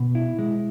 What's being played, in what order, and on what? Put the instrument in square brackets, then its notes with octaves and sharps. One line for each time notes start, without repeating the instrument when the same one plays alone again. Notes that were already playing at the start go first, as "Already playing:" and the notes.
Already playing: [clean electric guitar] B2
E4
G#3